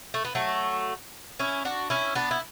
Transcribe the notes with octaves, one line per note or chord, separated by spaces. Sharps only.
A3
B3
F#3 A3
C#4 E4
D4 F#4
C#4 E4
B3 D4
E4